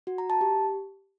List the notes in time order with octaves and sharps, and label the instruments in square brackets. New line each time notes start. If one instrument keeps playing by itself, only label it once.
[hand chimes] F#4
A#5
A5
G4